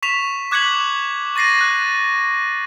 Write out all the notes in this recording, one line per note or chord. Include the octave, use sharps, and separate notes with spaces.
C#6 B6 E7 F7
D6 F#6 G#6 B6 C#7 F#7
C#6 A6 A#6 C7 D#7
F#6